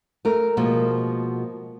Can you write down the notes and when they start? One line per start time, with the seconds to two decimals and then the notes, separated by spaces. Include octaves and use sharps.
0.25 A3 A#4
0.57 B2 F3 G#3 A#3